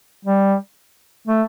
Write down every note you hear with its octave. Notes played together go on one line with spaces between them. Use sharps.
G3
A3